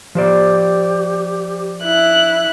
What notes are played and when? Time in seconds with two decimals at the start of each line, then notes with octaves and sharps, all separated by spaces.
0.15 F3 G4 C5 D5
1.83 E4 F#6